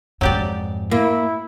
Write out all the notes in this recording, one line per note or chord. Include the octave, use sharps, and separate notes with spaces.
F2 G#2 F#3 G4 D5
A#3 E4